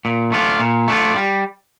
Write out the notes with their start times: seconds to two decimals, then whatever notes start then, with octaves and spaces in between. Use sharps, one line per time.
0.05 A#2
0.32 A3 D4 F4
0.60 A#2
0.88 A3 D4 F4
1.16 G3